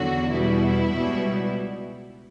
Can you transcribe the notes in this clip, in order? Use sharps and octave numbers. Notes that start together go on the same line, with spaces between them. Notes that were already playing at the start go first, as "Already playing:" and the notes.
Already playing: E2 D3 F#3 F#4
E2 B2 G3 E4
C#2 B2 G3